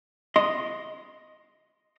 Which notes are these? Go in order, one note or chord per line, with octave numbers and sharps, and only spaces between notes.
D#5 C6